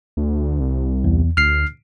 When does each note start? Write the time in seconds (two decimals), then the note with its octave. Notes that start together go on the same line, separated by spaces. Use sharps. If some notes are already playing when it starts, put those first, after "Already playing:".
0.17 D2
0.60 C2
1.04 E2
1.37 D2 F6 C7